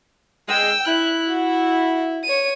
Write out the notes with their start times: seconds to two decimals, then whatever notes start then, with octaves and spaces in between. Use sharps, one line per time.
0.49 G#3 G5 E6
0.87 E4 F#6
1.28 F#4
2.24 C#5 D#7